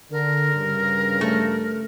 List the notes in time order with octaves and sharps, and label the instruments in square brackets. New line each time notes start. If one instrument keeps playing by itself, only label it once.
[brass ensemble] D3 [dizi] A#4
[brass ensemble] G2 C#3
[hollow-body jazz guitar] A3